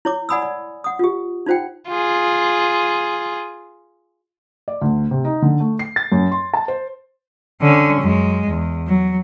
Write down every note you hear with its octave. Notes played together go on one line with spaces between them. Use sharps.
E4 C#5 D6
D5 F#5 G#5 B5 D#6 E6
D5
F#5 D#6
F4 G4
D#4 F4 C5 F#5 G5
F4 G#4
D5
D2
C3
D#4
D3
A3
C7
A6
F#2
C6
A5
C5
D3 C#4
F#2 G#3
E2
F#3